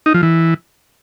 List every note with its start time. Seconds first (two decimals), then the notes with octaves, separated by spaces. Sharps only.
0.06 D#4
0.14 F3
0.23 E3